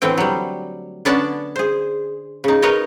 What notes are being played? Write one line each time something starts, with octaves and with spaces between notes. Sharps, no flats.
A2 D3 E3 A3 C4 G5
F#3 G3
D3 B3 C#4 D4 D5 A5
G#4 C5
C#3 D#4
D#4 A#4 B4 C#5 D#5